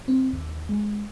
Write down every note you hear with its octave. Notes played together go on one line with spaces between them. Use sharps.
C4
D#2
G#3